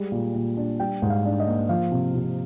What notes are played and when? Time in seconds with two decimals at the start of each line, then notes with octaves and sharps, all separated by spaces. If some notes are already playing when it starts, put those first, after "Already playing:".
Already playing: G3 G#3
0.12 A#2
0.35 A#2
0.57 D4
0.80 G3 G5
1.02 G#2
1.10 F5
1.25 D4
1.40 D#5
1.47 A#3
1.69 F3 F5
1.92 C3
2.15 C3